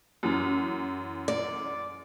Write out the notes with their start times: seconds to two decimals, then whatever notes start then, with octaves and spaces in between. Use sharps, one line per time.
0.23 F#2 E3
1.28 D5